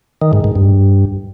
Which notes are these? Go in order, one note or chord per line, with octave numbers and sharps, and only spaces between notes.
D#3
G#2
G#2
G2